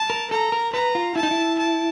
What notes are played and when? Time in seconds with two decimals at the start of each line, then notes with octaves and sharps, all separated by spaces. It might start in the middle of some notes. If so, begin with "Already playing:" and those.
Already playing: A5
0.10 A#4
0.31 A4 A#5
0.52 A#4
0.73 B4 A#5
0.95 F4
1.16 E4 A5
1.23 D#4
1.31 E4
1.59 A5